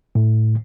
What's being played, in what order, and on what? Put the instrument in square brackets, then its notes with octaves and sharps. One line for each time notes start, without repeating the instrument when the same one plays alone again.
[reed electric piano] A2